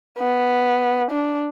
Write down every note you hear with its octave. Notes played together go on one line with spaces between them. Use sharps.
B3
D4